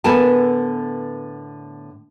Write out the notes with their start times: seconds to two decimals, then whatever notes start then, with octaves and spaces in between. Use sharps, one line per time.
0.04 A2 D3 B3 A#4 G#5 A5